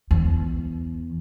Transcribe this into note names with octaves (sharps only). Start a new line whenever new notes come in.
E2